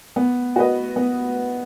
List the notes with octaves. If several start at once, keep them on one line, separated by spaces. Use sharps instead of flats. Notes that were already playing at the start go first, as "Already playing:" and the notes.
B3
F#4 B4 D#5
B3